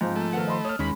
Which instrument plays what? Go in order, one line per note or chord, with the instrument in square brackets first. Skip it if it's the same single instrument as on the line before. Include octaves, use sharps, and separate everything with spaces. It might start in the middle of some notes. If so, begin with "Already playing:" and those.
[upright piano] G#2 C4 [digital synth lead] F3
[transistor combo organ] A3
[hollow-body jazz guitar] D#3 F#5 [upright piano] B3 A#4
[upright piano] D#5 B5 C6
[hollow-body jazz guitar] C#5 [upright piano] D#6 F6
[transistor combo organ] D#2 [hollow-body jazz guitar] G#3 C#4 [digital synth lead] B5